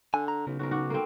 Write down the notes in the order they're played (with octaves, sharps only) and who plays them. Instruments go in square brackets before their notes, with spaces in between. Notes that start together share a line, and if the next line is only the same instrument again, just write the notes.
[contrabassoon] D3 [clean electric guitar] G#5
[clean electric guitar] A#5
[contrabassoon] B1 [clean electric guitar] C#3
[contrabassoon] B1 [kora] F#4 A#4
[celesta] D#4 F#5 D6 [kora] F#4
[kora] A#3 C4 [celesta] A4